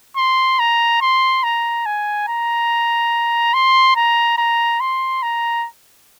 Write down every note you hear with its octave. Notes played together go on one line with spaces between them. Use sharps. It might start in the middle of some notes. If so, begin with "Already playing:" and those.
C6
A#5
C6
A#5
G#5
A#5
C6
A#5
A#5
C6
A#5